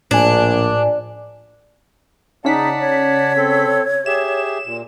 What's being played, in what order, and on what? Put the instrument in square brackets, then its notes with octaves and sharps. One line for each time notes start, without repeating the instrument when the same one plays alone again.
[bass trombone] A#1 [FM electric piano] A2 G#5 [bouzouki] D4
[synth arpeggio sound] C#3 C#4 B6 [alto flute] D#4 [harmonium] D5 F#5 A5
[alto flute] C#5
[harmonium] C4 A4
[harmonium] G4 G#4 E5 [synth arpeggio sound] E7
[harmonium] A#2